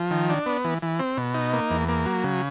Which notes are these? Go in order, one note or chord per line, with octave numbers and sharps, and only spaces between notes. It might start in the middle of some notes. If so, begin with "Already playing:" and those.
Already playing: F3
D#3
D4
B3
E3
E3
C4
B2
D#4
A#3
E2
A#3
F#3
C#3